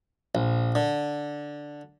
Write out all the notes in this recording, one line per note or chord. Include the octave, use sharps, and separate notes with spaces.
A#1
D3